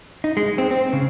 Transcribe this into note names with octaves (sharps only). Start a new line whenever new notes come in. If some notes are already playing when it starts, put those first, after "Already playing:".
D#4
G#3
C4
C4
C#3